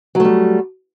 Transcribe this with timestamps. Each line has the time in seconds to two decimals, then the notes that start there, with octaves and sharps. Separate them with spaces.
0.15 F#3
0.20 A3
0.25 G3